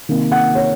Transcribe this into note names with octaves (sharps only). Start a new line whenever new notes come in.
C3 D#3 A#3
F#5
C#5